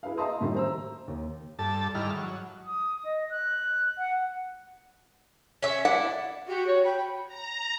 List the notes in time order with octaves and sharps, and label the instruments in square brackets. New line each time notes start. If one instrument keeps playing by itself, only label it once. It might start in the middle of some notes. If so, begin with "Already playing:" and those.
[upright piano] E4 G#4 B4 E5 F5
D#5 E5 A5 A#5 C6 D#6
F#2 A2 D#3 G3 E5 C6
C5 A#5 E6
D#2
[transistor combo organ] G2 A4 A5
G#2 D#3 G3 E4 F6
F#3
[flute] D#6
D#5
F#6
F#5
[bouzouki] C#4 E5
[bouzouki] D4 E4 [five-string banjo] F#5
[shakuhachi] F#4 [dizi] G4
[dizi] C#5
[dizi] G5 [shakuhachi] B5
[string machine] A#5